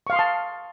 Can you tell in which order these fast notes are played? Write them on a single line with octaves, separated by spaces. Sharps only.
C#6 F5 C6 D#6 A5